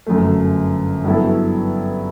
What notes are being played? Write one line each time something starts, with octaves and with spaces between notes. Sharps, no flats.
G1 F#2 F#3 A3
G2 F#3 B3 E4 A4